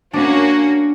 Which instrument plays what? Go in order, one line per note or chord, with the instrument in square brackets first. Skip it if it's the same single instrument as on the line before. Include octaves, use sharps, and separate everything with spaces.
[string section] A#3 C#4 F#4 [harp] D4